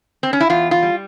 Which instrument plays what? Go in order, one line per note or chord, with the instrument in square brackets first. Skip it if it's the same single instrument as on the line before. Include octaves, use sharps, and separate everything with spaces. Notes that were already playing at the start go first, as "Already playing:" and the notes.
[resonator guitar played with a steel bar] C4
C#4
E4
E2 F4
F4
G3